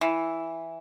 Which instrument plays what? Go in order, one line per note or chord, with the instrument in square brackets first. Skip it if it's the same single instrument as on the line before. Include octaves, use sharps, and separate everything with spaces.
[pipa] E3